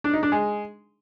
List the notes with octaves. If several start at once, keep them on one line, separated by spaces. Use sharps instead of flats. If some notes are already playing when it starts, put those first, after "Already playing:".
D4
D#4
D4
G#3